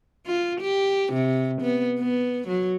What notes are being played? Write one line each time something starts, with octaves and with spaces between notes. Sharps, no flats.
F4
G4
C3
B3
B3
F#3